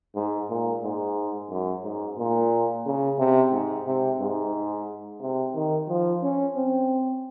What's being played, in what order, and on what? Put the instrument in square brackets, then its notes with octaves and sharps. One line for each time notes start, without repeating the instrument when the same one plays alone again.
[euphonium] G#2
A#2
G#2
F#2
G#2
A#2
C#3
C3
G#2
C3
G#2
C3
D#3
F3
C#4
C4